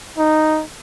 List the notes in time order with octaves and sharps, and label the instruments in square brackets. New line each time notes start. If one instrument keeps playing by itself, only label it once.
[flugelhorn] D#4